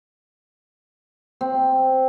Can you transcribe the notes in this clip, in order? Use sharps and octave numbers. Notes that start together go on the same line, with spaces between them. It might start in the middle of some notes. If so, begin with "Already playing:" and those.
C4